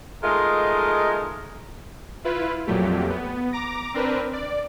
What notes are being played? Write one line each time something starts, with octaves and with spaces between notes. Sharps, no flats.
G#3 A3 D#4 F4 A#4 D#5
E4 F4 B4
F2 A#2 F#3 A3 G4
B3
A#5 D6 A#6
C4 D4 A#4 B4
D5